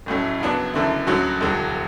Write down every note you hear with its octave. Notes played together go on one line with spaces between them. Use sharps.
A1 A2 F#3 A3 C#4
F#2 C#3 F#3 B3 D4
F#1 F#2 D3 A3 E4
D2 D3 F#3 C#4 F#4
E1 D2 D3 F#3